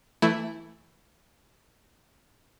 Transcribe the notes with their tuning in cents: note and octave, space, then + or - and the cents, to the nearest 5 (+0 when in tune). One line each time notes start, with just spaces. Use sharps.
E3 +0 A3 +15 E4 +0